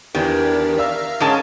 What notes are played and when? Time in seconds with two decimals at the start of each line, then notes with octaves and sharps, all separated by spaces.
0.15 E2 D#3 E3 D4 G4 A#4 G#6
0.78 D5 E5 F5 A#5 E6
1.20 G#2 G#3 C#4 F4 A#4 A5